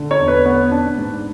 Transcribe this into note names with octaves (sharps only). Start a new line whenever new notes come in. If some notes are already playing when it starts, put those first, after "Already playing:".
Already playing: D3
C#5
E1
B4
B3
D4
G#2